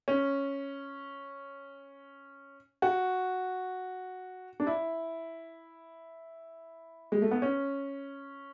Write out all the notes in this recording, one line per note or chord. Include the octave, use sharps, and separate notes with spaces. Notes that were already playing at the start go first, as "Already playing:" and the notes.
C#4
F#4
D4
E4
G#3
A3
B3
C#4